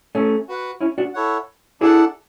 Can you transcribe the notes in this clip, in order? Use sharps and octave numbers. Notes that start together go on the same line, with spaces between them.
A3 C#4
F#4 B4 F#5
C#4 E4
D4 F#4
E4 A4 C#5 F#5
D4 E4 G#4 A4 D5 F#5